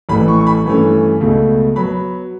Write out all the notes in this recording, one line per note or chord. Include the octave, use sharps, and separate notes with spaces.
A1 A2 E3 B5
C#6
C#6
B5
G2 E3 A3 C#4
C#2 B2 A3
F#3 B3 B5